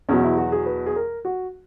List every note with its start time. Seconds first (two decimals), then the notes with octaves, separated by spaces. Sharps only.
0.09 E2 B2 F#3 C#4
0.23 E4
0.38 F#4
0.52 G#4
0.66 B4
0.86 G#4
0.96 A#4
1.25 F#4